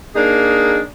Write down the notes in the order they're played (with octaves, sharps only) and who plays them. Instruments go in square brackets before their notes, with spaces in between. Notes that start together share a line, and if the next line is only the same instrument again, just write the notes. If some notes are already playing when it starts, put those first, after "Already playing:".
[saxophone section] A#3 D4 D#4 G#4